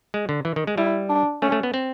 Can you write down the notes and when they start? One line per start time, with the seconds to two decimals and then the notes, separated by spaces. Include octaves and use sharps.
0.14 G#3
0.29 D3
0.45 E3
0.56 D#3
0.67 G#3
0.78 G3 E4
1.09 D4
1.42 A3 C#4
1.52 A3
1.63 B3
1.74 C4